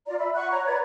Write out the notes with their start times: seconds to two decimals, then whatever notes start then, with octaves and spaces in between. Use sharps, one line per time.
0.07 F4 D5 A#5
0.19 E5 B5
0.35 F#5 C#6 F#6
0.52 C#5 A#5
0.66 B4 D5 G#6